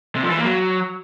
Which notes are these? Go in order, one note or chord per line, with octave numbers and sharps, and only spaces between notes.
C3
F3
E3
A#3
F#3